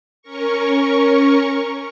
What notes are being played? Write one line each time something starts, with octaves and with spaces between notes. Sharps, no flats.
C#4 A#4 C#6